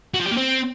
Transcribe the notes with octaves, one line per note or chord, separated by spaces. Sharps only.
F#4
F3
G4
A#3
C4